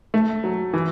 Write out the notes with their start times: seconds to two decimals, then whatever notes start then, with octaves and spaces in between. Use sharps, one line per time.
0.14 A3
0.44 F#3
0.74 E3